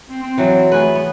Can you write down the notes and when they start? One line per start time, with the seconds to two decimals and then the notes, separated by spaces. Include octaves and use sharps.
0.10 C4
0.23 C4
0.38 E3 F#3
0.72 A3 G#4 B4
0.95 B3